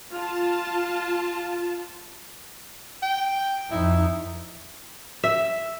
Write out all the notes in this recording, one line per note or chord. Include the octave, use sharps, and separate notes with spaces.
F4 A5
G5
F2 D#4 E4
E5